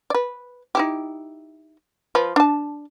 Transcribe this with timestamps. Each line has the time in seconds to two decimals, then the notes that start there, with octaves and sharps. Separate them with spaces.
0.10 B4 D5
0.75 D#4 E4 G4
2.15 F3 B4
2.36 D4 A5